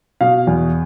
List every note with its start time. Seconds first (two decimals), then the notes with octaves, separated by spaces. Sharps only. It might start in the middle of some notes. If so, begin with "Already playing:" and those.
0.21 B2 F5
0.47 E2